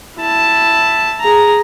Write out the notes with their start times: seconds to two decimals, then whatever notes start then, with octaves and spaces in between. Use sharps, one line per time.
0.17 E4 A5
1.20 G#4 A#5